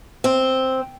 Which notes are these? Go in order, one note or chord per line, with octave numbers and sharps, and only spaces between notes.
C4